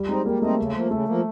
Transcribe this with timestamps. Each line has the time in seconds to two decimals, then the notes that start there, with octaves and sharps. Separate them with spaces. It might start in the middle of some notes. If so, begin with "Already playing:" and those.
Already playing: G3
0.08 G#3 C4 D#4
0.25 G3 A#3
0.41 A3 C4 D#4
0.59 C#3
0.75 F3 A#3
0.91 C#3 A3
1.08 F3 A#3